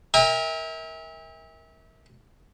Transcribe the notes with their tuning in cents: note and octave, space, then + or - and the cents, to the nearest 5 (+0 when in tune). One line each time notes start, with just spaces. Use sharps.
A#4 +0 E5 -35 G5 +45